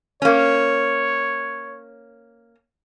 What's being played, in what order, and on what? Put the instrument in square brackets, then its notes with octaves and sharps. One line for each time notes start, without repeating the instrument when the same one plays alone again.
[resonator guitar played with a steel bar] A#3 C#4 [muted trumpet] C#5